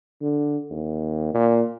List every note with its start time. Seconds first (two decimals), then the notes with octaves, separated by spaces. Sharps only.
0.21 D3
0.70 D#2
1.34 A#2